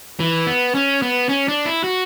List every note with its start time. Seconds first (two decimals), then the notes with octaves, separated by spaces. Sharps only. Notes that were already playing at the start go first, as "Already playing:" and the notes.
0.20 E3
0.47 B3
0.75 C#4
1.02 B3
1.29 C#4
1.48 D4
1.65 E4
1.84 F#4